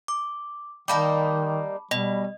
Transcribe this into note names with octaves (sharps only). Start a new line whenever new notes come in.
D6
D#3 G3 A#3 D#4 A5 B5 D6
B2 G3 D#5